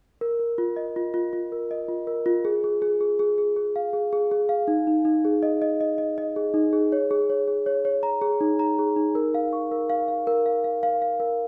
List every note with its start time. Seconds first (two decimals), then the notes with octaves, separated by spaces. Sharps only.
0.21 A#4
0.39 A#4
0.58 F4
0.76 D#5
0.96 F4
1.14 F4
1.33 F4
1.52 A#4
1.71 D#5
1.88 F4
2.07 A#4
2.26 F4
2.45 G#4
2.64 G#4
2.82 G#4
3.01 G#4
3.19 G#4
3.38 G#4
3.56 G#4
3.76 F5
3.93 G#4
4.13 G#4
4.31 G#4
4.49 F5
4.68 D#4
4.87 D#4
5.05 D#4
5.25 G#4
5.43 D#5
5.62 D#5
5.81 D#5
5.98 D#5
6.18 D#5
6.36 G#4
6.54 D#4
6.73 G#4
6.92 C#5
7.11 G#4
7.30 C#5
7.47 G#4
7.66 C#5
7.85 C#5
8.03 A#5
8.22 G#4
8.41 D#4
8.59 A#5
8.79 G#4
8.96 D#4
9.15 A#4
9.34 F5
9.53 C#6
9.71 A#4
9.90 F5
10.08 F5
10.27 A#4
10.46 F5
10.64 F5
10.83 F5
11.02 F5
11.20 A#4